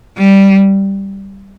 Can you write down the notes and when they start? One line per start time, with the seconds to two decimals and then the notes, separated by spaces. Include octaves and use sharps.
0.19 G3